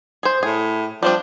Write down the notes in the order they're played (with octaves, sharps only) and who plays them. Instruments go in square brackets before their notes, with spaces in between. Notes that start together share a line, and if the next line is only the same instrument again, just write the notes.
[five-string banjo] G#4 C5
[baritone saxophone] A2 [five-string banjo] G#4
[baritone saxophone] F3 [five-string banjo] G3 C4 D4